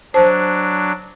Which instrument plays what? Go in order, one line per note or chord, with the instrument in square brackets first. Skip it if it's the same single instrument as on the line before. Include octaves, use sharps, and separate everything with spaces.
[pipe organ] F#3 D4 [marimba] C5 A5